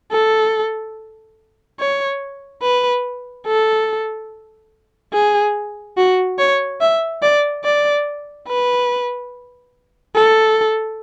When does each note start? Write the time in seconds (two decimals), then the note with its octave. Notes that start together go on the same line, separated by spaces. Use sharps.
0.12 A4
1.79 C#5
2.62 B4
3.47 A4
5.13 G#4
5.97 F#4
6.39 C#5
6.81 E5
7.22 D5
7.64 D5
8.48 B4
10.15 A4